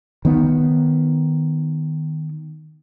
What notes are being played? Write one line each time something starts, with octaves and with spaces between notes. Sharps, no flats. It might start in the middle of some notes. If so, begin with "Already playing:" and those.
D#3 B3